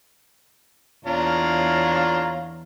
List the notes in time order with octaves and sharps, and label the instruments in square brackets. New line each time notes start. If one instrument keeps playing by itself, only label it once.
[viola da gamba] E2 [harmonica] D4 F4 A#5 [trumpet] C#5 [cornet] F5